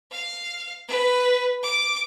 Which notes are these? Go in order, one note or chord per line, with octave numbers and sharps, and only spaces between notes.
F5
B4
D6